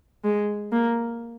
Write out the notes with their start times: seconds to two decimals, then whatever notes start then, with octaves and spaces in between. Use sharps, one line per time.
0.24 G#3
0.72 A#3